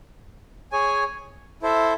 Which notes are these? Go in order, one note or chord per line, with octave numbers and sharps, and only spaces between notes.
G#4 C#5 G#5
E4 A4 C5 E5